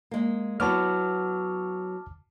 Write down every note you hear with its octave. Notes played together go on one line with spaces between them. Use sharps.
G#3 A#3
F#3 B3 E4 A5 D6 F6